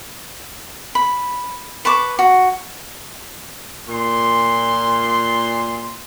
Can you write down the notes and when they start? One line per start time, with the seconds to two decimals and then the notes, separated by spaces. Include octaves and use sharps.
0.95 B5
1.85 B4 A5 C#6 D6
2.19 F#4
3.89 A#2 C6